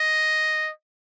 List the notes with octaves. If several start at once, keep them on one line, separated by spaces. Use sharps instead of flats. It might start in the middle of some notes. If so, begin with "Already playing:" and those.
Already playing: D#5